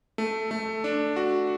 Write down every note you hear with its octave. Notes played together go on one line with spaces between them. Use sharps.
A3
A3
D4
F#4